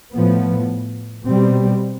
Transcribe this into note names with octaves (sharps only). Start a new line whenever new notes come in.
A2 F3 B3
B2 G3 C4